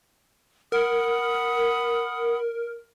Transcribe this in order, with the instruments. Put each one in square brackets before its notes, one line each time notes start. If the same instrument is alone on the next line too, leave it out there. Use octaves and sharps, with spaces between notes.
[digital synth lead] A#4 [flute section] F#5 B5 D#6